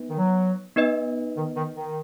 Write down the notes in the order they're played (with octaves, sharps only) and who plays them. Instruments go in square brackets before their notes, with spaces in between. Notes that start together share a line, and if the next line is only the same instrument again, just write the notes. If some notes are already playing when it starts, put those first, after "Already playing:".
Already playing: [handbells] B3 D#4 B4
[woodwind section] D#3
F#3
[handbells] B3 D#4 B4 D#5
[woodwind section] D#3
D#3
D#3